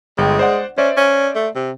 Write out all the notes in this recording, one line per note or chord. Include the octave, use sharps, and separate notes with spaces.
G1 G#3 G5
C5 D5 F#5
C#4 C5 D5 E5
C#4
A3
C3